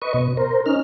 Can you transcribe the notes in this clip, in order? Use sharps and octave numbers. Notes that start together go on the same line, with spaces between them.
B4 D#5 C#6
B2
A#4 C5
C#4 D#4 F6